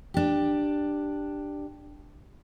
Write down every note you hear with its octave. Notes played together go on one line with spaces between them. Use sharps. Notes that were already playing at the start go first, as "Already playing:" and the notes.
D4 G4